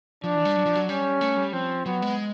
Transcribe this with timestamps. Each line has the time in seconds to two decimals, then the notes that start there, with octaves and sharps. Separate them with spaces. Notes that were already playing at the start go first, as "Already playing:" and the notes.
0.24 F3 D4
0.35 E3
0.45 G3
0.56 F#3
0.66 F3
0.75 F#3
0.89 G3 C#4
1.21 A3
1.37 G3
1.53 F3 C4
1.86 F#3 B3
2.02 G#3